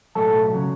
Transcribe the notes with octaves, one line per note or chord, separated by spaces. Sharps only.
B1 A2 F#3 A4 A5
C#3 F#3